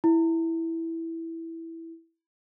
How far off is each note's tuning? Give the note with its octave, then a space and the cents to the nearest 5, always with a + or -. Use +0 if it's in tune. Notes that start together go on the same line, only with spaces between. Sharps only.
E4 -5